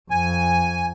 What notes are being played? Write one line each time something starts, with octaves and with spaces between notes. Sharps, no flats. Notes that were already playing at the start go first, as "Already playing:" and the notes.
F2 G#5